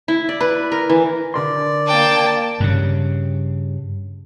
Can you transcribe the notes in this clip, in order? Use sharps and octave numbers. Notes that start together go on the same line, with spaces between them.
E4
D5
B4
A#4
E3
D3 A#4 D5 C6
A#3 G5 A5
G2 C#3